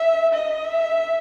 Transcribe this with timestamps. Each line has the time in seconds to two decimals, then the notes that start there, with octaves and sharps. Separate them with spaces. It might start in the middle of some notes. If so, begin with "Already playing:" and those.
Already playing: E5
0.34 D#5
0.65 E5